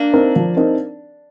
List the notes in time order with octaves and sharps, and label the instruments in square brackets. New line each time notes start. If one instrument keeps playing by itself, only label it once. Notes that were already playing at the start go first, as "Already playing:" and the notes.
Already playing: [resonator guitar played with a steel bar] A#3 D4
[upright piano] C4 D#4 A#4
F3
C4 D#4 A#4